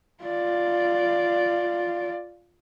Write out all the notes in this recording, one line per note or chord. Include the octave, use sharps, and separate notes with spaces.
F4 D5